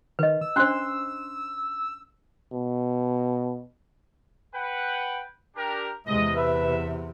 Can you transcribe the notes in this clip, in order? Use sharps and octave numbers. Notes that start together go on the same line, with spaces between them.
D#3 B4 D#5
E6
C#4 D4 C5 C6 F#6
B2
B4 F#5 G5
D4 G4 A#4
E2 C3 G#3 D#5
B4 E5